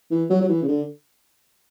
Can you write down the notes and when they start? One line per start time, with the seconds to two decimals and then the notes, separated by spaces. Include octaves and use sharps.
0.11 E3
0.30 F#3
0.41 F#3
0.48 E3
0.62 C#3
0.68 D3